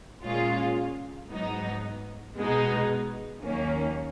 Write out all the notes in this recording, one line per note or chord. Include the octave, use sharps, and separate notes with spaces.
A#2 G#3 C#4 F4
G#2 F#3 B3 D#4
B2 G#3 B3 D#4
D#2 D#3 F#3 A#3 C#4